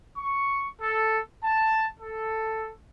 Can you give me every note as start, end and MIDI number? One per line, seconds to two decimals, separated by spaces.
0.17 0.67 85
0.81 1.20 69
1.44 1.87 81
2.00 2.71 69